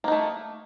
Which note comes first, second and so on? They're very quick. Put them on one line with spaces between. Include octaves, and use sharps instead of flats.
A#3 D#4 A3